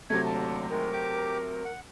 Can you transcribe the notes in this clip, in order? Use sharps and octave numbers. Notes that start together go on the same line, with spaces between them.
C3 F#3 A3 G#6
D#2 D3 A5
D#3 G#3 A#4
G4 D6
F#5